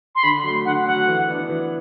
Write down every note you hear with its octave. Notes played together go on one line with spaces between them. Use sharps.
C6
D3 B5
F#3 A3 C6
D3 F#5
F#3 A3 F#5
E3
B3 D4
E3